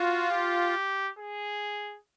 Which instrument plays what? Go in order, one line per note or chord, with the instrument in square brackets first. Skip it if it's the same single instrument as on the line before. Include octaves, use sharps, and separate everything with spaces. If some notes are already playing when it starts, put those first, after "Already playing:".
Already playing: [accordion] F4 [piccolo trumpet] F#4
[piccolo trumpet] G4
G#4